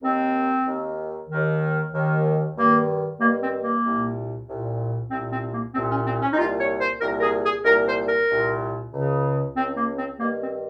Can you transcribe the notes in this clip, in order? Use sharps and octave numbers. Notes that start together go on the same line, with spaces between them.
D#2 D#3 C4
D#2 D#3
D#2 D#3
D#2 D#3
G2 D#3 A#3
G2 D#3 A#3
C4
A#3
C2 A#2
C2 A#2
C2 A#2 C4
C4
A#3
C2 A#2 C4
C#4
C4
C#4
D#4
C2 A#2 F4
C#5
C5
C2 A#2 A#4
A#4
G#4
G#4
C2 A#2 A#4
C5
A#4
C2 A#2
C#2 C#3
C#2 C#3 C4
A#3
C4
G2 D#3 A#3
C4